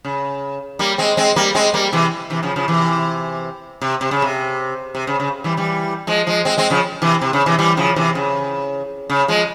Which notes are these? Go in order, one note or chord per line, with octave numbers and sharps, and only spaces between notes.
C#3
G3 A#3
G#3 C4
G#3 C4
G3 A#3
G#3 C4
G3 A#3
C3 E3
C3 E3
C#3 F3
C#3 F3
C3 E3
C3
C3
C#3
C3
C3
C#3
C#3
E3 G3
E3 G3
F3 G#3
F3 G#3
G#3 C4
G#3 C4
C#3 F3
C3 E3
C3
C#3
C3 E3
E3 G3
C#3 F3
C3 E3
C#3
C#3
F3 G#3